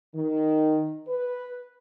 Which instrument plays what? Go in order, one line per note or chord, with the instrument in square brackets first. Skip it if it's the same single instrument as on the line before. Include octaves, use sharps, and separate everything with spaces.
[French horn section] D#3
B4